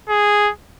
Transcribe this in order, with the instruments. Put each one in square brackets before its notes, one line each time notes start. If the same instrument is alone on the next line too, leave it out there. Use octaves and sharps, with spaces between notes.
[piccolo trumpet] G#4